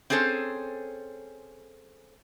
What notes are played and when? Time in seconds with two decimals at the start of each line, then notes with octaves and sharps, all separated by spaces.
0.10 C4 C#4 G#4 A4 C5